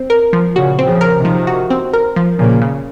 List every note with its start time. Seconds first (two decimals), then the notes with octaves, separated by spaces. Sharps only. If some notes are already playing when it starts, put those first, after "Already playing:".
Already playing: C4
0.10 A#4
0.33 F3
0.55 A#2 C#3 F#4
0.79 C4
0.86 C#3 F3
1.01 A#4
1.17 C3 D#3
1.25 F3
1.47 F#4
1.70 C4
1.93 A#4
2.16 F3
2.39 A#2 C#3 F3
2.61 C#3